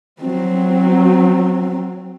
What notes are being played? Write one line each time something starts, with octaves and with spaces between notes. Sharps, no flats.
F#3 C4